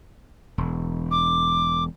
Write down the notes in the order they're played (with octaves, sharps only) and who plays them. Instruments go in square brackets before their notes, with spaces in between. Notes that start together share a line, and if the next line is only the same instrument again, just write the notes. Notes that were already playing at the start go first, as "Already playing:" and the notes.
[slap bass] E1
[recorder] D6